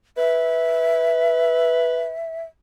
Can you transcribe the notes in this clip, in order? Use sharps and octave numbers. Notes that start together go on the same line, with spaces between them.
B4 E5